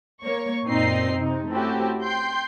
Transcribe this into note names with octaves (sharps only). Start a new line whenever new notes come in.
A#3 C#5 C#6
F#2 A#2 C4 D#4 C7
C3 D#4
A3 C4 C#4 E4 F#4 G4
G5 C6 G6